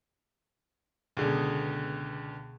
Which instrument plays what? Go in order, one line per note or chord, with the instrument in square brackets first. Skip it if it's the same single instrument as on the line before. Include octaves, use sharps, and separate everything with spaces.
[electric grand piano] C#2 D3 [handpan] B2 G#4